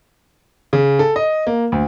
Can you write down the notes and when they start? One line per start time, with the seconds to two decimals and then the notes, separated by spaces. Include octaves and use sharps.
0.73 C#3
0.99 A4
1.16 D#5
1.47 A#3
1.72 D2